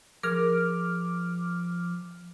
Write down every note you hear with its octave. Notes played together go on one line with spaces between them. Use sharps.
F3 G#4 A#4 D6 F6